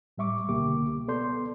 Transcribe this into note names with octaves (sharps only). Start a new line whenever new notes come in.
A2 G3 E5 C#6 D6
C#2 B2 D3 A#3 G4 D6
B3 A4 D5 C6 G6